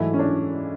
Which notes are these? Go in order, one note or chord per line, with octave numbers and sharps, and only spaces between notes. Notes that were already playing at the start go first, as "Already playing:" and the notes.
Already playing: G#2 E3 F#3 A3 E4
C#4
D4